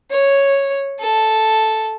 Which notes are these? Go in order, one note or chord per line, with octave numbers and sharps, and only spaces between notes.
C#5
A4